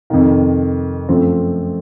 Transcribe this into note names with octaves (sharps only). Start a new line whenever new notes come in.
F2 C3 D#3
F#2 F3 A3 C4